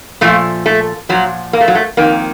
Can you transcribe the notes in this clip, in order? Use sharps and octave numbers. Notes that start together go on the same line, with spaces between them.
A#2 F3 A3
A3
A#2 F3 F#3
A#3
A3
F#3
A3
F2 D#3 A#3